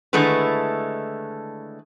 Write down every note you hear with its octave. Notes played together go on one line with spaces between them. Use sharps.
D3 D#3 G#3 A3 E4 B4